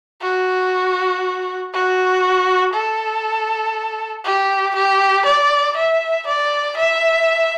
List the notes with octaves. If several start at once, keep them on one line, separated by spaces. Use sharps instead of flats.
F#4
F#4
A4
G4
G4
D5
E5
D5
E5